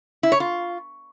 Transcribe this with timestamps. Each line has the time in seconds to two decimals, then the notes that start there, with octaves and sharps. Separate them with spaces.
0.23 E4
0.32 C#5
0.40 F4